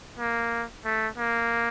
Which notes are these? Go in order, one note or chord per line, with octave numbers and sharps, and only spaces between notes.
A#3
A3
A#3